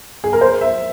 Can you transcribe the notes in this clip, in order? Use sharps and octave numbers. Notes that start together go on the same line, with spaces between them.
G#4
A#4
C5
E5